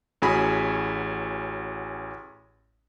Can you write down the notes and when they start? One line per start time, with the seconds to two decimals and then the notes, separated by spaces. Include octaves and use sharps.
0.22 A1 C#4 F#4 G#4 G#5 B5